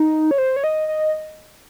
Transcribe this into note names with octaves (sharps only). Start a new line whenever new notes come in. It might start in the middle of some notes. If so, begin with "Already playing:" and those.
Already playing: D#4
C#5
C5
C#5
D#5
D#5